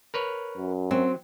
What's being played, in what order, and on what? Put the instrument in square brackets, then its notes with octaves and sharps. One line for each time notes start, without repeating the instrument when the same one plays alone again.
[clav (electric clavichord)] A#4 B4 C#5
[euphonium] F#2
[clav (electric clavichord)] F#3 [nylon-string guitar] C4